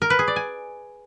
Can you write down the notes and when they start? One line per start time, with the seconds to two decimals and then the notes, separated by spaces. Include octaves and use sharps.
0.02 A#4
0.10 B4
0.19 G#4
0.28 D5
0.36 G#5